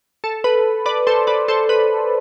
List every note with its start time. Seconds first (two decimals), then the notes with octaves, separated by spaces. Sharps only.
0.24 A4
0.44 B4
0.86 B4 D5
1.07 A4 C5
1.27 B4 D5
1.48 A4 C5
1.69 B4